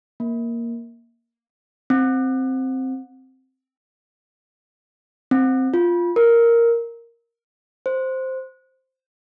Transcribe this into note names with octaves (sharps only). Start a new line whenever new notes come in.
A#3
C4
C4
F4
A#4
C5